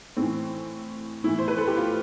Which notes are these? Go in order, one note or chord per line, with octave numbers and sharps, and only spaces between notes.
A2 E3 C4
A2 E3 E4
C5
B4
A4
G4
F4